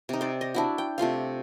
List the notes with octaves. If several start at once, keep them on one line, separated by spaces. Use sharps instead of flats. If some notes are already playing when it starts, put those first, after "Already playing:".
C3 D#4
C5 D5
D#5
D4 E4 F#4
G5
C3 A3 F4 F5